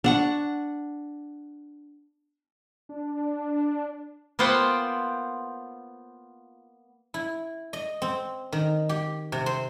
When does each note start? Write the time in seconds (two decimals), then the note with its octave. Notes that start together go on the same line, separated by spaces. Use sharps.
0.04 D4 F#5 C#6
2.89 D4
4.39 A#3 B3 F4 C5 F#5 G5
7.14 E4
7.73 D#5
8.02 C4
8.53 D#3
8.89 G4
9.32 C3
9.46 C5